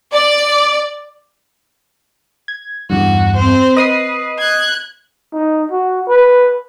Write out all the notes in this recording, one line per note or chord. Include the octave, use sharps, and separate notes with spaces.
D5
G#6
E2 G2 F#4
C4 C5
B4 D#5 D#6 C7
F#6 G#6
D#4
F#4
B4